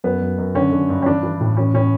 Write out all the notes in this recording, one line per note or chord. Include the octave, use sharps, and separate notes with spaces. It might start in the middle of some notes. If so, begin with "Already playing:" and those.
F#2 B3
F#2
F#2
D3 C#4
D3
G2
C#4
E3 D4
E3
A2
E3 C#4
A2 C#4